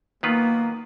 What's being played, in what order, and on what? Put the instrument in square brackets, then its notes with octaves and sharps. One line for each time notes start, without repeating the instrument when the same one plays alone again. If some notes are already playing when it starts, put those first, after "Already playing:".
[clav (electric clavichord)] D#3 F#3 B3 F4 B4 [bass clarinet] A#3